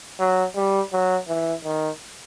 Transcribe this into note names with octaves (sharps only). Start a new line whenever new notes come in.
F#3
G3
F#3
E3
D#3